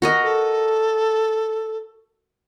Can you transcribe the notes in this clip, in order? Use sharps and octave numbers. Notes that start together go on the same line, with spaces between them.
F#4 A#4 D#5
A4